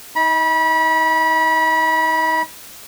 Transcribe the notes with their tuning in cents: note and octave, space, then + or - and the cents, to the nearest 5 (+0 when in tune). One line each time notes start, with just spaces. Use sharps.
D#4 +30 B5 -30